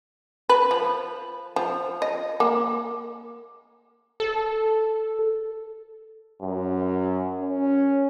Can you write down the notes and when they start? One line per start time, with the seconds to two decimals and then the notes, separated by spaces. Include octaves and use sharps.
0.49 B4
0.71 F3
1.56 F3
2.02 D#5
2.40 A#3
4.20 A4
6.42 F#2
7.41 C#4